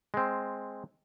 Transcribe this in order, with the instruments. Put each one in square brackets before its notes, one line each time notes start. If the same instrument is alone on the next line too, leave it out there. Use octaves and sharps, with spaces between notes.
[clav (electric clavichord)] G#3 C4